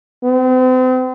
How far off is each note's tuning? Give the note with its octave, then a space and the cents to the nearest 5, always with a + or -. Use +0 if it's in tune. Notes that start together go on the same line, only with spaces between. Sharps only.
C4 -40